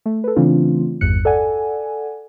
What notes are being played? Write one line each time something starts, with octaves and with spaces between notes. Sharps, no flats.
A3
A4 B4
C#3 E3 A3 C4 D4 F4
G#1 E2 G2 F#6 C#7
A4 D5 F#5 G#5